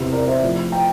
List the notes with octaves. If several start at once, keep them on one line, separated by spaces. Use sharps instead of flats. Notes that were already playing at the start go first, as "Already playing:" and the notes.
Already playing: E2 C3 E3
A#4 D5
C5 E5
A2 F3
G5 A#5